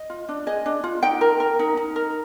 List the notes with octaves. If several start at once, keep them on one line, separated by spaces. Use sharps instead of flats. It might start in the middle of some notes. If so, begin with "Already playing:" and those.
Already playing: D#5
F4
D4
G#4 D#5
D4
F4
D#4 G5
A#4
A#4
D#4
D#4
A#4